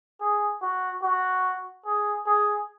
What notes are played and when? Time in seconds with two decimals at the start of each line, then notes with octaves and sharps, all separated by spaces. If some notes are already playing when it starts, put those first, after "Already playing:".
0.21 G#4
0.62 F#4
1.03 F#4
1.86 G#4
2.26 G#4